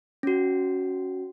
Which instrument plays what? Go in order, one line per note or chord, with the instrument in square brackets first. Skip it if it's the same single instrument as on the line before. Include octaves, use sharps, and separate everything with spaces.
[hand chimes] C#4 F#4